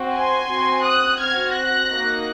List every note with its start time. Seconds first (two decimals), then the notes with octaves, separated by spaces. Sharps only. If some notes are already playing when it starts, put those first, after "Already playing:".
Already playing: C4 F#4
0.13 G#5 C6
0.48 C4 F#4
0.84 D#6 F#6
1.19 C4 F#4 F6 G#6
1.54 F#6 A#6
1.90 A#3 D#4 F#4